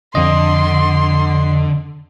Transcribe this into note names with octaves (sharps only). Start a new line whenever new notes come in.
F2 D3 D#5 C6